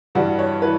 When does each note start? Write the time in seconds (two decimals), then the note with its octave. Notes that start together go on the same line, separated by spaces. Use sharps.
0.15 G2 E3 G3 F#4
0.39 C#5
0.62 E3 B4